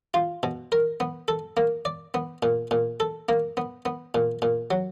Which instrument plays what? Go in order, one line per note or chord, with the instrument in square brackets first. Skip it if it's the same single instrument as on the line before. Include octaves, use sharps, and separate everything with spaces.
[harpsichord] F4
B2
A#4
B3
A4
A#3
D5
B3
A#2
A#2
A4
A#3
B3
B3
A#2
A#2
F#3